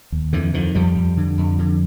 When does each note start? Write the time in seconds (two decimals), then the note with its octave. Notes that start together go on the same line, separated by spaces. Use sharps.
0.12 D#2
0.33 F2 D3 E3
0.54 D3 D#3 F3
0.75 F2 F3 G3
0.96 F2
1.17 D3
1.38 F2
1.59 D3